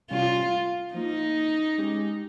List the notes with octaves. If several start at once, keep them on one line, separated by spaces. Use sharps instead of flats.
C3 G3 C#4 F4
F3 A#3 D#4 F4
G#3 C#4 G4